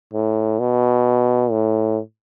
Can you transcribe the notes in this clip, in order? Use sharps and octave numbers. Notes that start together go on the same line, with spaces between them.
A2
B2
A2